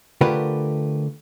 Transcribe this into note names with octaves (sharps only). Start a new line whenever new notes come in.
D3 A3 F4 G4 A#4 B4